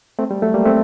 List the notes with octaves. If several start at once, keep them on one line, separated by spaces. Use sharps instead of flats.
A3 C4
G3
F#3 A3
G3 A#3
A3 C4